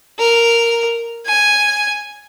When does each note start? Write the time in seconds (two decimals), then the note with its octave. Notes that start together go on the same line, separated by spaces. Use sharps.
0.19 A#4
1.26 G#5